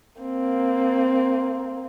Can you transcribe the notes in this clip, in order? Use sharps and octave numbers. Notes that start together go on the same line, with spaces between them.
A#3 C4